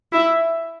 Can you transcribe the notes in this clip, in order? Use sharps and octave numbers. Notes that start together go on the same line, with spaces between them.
E4 E5